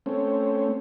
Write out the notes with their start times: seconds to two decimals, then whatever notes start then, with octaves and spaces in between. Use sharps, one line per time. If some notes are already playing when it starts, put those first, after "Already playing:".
0.06 A3 C4 C#4